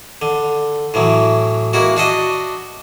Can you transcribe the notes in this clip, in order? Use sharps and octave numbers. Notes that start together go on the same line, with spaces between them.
D3
A2 E3 F#3
G#3 A#3 E4 F#4
D4 F#4 D#5